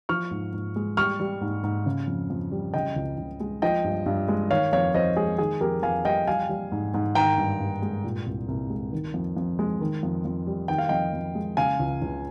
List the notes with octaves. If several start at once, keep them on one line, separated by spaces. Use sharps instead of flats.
F3 C#6 F6
G#2
G#2
G#3
G3 C#6 F6
G3
G#2
G#2
C#3
F2
F2
G3
C#3 D#5 G5
C#2
C#2
G#3
F3 D#5 G5
G2
G2
G#3
D#3 C#5 F5
F2 C#5 F5
F2 C5 D#5
G#3 G#4
D#3 G#4
F2 G4 A#4
F2 F5 G#5
G3 D#5 G5
G3 F5 G#5
G3
G#2
G#2
D#3 G5 A#5
G2
G2
G#3
A#2
C2
C2
G#3
D#3
F2
F2
G#3
D#3
F2
F2
G3
D#3 G5
F5
F2 D#5 G5
F2
G#3
C#3 F5 G#5
C#2
C#2